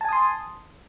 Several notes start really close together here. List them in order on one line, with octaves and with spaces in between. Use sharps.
A5 G#5 D#6 C6